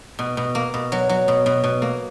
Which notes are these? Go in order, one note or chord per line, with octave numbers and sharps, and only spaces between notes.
B2
B2
A#3
B2
F#3
F#3
B2
B2
B2
A#3